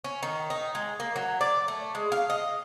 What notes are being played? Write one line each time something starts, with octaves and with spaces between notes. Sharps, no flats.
C#4
D#3
D#4
G#3
A#3
F#3
D5
A3
G#3
F5
D#5